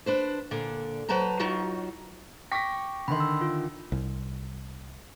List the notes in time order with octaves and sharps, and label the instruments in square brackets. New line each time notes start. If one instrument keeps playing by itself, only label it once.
[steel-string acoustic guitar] D4 B4 C5
A#2 D3 D4
F#3 B4 C5 A5 A#5
F#3 D#4 F4 F#4
[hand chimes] G5 C#6 D6 [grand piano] A#6 B6
[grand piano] D3 D#3 [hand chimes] B5 C6
[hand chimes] E6
F4
[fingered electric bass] C2